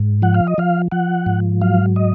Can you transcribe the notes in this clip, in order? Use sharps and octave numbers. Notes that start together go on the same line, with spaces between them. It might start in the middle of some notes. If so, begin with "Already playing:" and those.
Already playing: G#2
F3 F#5
F5
D#5
F3 F5
F3 F#5
G#2
F#3 F5
D#5